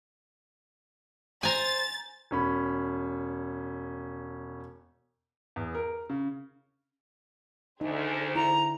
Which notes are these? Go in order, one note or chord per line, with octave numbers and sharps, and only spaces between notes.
C5 G#5 A#5 A6
E1 C#4 B5
E2
A#4
C#3
D2 D3 D#4 G#4 C5
E4 A#5